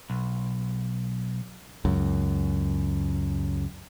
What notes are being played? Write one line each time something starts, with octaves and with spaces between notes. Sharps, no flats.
B1
C#2 F#2